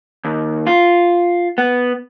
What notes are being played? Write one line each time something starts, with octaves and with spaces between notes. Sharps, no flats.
D#2
F4
B3